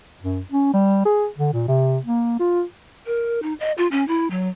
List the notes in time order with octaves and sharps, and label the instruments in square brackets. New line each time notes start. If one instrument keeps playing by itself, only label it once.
[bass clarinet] F#2
C#4
G3
G#4
D3
A#2
C3
A#3
F4
[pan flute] A#4
D#4
D#5
F4
C#4
E4
F#3